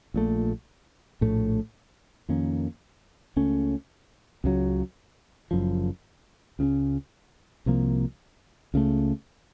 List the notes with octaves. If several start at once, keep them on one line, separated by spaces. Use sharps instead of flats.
A#1 A#2 A3
A#1 A2 A3
F2 D#3 A#3 C#4
C#2 C#3 A3 C#4
C#2 C#3 F#3
F#1 F#2 F3
C#2 C#3 A3 C#4
C2 C3 F3 A#3
C#2 C#3 F#3 A3